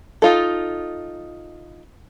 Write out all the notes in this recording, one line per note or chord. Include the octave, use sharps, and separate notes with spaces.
D#4 F4 A4